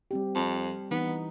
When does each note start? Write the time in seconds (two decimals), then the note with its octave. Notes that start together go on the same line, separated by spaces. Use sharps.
0.11 G3 C4 G4
0.35 F2
0.91 E3 B3 D#4